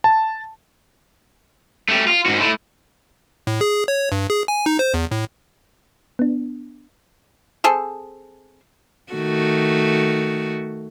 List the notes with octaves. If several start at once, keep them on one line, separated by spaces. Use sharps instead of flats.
A5
A3 G4
F4
G#2 F#4
A3 E4
A2
G#4
C#5
G2
G#4
G#5
D#4
C5
E2
A2
B3 D4
C4 G#4 A4
D#3 A3 F#4